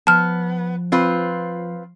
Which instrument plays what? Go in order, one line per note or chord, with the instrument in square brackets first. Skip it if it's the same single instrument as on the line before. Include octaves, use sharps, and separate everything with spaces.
[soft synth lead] F3 [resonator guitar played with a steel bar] B3 [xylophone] A5 F6
[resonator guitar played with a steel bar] C4 F4 B4